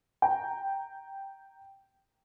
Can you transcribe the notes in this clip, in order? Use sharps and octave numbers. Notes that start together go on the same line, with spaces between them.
G5 A#5